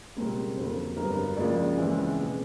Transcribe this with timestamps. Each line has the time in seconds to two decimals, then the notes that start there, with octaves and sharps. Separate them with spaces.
0.16 C#2 B2 G3 C4 A#4
0.57 F2 D3 F#3 A#3 C5
0.96 G2 D3 F#3 B3 A#4
1.10 A#4
1.24 B4
1.37 C#2 C#3 F3 A#3 D5
1.77 C#2 C#3 E3 G#3 C4
2.17 B2 G#3 B3